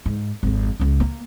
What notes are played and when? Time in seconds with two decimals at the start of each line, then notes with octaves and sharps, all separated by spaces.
0.06 G#2
0.43 G#1 F2
0.80 C#2 C#4
1.00 A#3